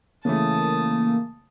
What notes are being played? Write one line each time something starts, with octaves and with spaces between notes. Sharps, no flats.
C#3 E3 A3 A#3 A5 D#6